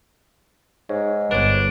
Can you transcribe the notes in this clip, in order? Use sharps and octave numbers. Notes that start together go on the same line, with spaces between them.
G#2 C#5
G1 D4 B4 C#5